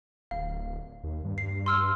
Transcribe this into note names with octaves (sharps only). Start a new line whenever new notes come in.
D1 F5
D#2
G2
C7
C6 E6 F6